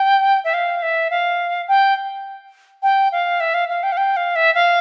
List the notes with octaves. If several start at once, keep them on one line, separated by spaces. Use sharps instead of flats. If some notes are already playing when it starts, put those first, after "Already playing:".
Already playing: G5
E5
F5
E5
F5
G5
G5
F5
E5
F5
F5
G5
F5
G5
F5
E5
F5